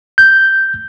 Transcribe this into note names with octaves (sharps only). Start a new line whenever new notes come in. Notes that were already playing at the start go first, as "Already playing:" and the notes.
G6